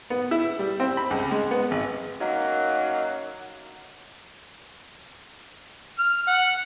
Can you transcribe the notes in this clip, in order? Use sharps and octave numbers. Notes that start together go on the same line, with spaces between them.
B3
E4
G3
C4
B5
C#2
G#3
B3
G#1
F#2 F#3 A#3 D#4 F#5
F6
F#5